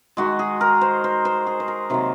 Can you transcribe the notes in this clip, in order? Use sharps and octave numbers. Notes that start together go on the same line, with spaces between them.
D#3 G#3 F#4
G#4
A#4
C5
C5
C5
G#4
C5
A#4
C3 D#3 F#3 A#3